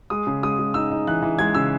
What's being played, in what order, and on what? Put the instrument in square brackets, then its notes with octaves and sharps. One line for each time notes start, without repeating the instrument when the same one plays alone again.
[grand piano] G#3 D#6
C#3
G#3 D#6
G#3
D#4 E6
D#4
E3 F#6
E3
G#3 G#6
C#3 E6